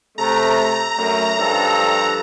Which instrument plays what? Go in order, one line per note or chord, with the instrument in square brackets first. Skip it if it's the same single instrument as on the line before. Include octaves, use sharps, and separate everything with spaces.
[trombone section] C3 A3 [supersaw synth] A#5
[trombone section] F#2 A3
G2 F3 A4